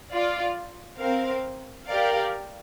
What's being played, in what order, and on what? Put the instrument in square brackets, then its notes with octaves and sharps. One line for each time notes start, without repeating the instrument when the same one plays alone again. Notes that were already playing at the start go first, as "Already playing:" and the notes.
[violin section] F4 D5 F5
C4 A#4 F5
G4 A#4 D5 F5